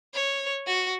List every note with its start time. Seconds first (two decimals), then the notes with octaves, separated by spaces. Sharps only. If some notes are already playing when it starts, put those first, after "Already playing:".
0.14 C#5
0.67 F#4